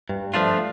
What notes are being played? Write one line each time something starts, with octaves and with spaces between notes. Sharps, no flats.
G2
F3 A3 D4 F4